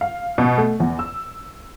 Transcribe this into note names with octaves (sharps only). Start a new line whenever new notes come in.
F5
B2
A3
E2
E6